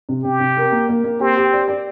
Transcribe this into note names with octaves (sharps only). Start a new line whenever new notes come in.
C3
C3 G4
C3
A#4
A#3
A#3
A#3
C4 G4
G4
D5
D5